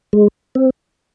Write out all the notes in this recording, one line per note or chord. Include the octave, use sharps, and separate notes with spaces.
G#3
C4